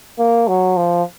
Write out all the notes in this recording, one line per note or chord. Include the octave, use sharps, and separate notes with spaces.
A#3
F#3
F3